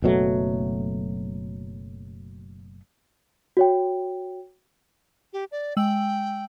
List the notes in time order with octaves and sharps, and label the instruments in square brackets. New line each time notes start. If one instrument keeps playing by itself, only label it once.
[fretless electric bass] F#1 B2 F#3 A3
[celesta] F#4 C#5 G5
[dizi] G4
D5
[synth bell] G#3 E6 F#7 [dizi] G5